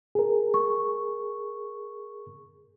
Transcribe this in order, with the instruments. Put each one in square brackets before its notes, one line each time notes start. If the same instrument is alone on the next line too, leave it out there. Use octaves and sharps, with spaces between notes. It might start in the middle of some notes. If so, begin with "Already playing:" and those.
[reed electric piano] G#4 A#4
[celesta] C#6